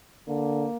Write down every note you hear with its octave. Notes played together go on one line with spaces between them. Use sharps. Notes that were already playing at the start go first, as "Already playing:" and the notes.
D3 A#3